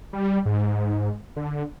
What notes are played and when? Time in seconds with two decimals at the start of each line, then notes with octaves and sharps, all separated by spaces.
0.13 G3
0.46 G#2
1.36 D3